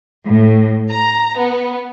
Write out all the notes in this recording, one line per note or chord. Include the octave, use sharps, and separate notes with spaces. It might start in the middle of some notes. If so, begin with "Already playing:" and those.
A2
A#5
B3